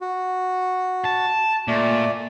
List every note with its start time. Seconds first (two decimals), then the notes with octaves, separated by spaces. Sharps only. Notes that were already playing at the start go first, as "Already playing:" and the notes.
0.01 F#4
1.05 A5
1.68 A#2 A3 D5